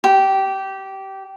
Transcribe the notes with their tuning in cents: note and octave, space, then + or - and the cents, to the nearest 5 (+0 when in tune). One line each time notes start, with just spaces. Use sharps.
G4 -20